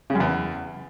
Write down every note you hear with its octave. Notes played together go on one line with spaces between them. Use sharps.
C#3
F#2
E2